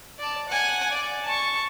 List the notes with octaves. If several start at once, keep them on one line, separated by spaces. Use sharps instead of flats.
D5 A5
F#5 G#5
D5
A5 C#6